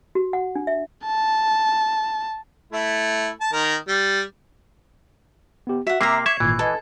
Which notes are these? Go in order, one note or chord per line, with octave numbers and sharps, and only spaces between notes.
F#4
F#5
D4
E5
A5
A3 E4
A5
D#3 A#4
G3
B3 G4
F#4 E5 F#5
C3 A#3 E5 A#5 D6 C7
E5 C#6 G#6
G#1 A#2 E3
A4 B4 D#5 G#5